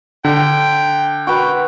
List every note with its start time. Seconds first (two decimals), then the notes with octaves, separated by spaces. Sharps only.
0.25 D3 G5
1.27 F#4 B4 G5